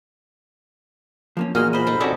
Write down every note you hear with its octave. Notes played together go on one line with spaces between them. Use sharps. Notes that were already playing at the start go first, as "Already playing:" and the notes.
F3 A#3 C#4
E2 A#2 A#3 F#4 G#4 D#5 F6
C5 D#5 B5
D#4 A4
C4 C#4 D#4 F#4 A4 D5 E5 D6